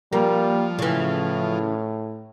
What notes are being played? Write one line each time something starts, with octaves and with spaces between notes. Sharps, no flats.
F3 G3 A#3
A2 C#3 E3